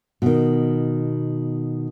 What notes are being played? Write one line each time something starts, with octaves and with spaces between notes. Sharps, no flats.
B2 D#3